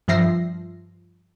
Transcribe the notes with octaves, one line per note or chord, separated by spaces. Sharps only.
G2 F3 E5 A#6 C7